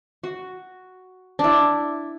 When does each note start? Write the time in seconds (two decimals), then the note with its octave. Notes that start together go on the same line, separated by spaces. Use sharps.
0.24 F#4
1.39 D4 E4